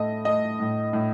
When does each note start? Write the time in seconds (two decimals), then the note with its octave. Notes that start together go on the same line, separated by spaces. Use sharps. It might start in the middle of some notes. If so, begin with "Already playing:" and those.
Already playing: A2 A3 D#5
0.25 A3 D#5
0.60 A2
0.93 A2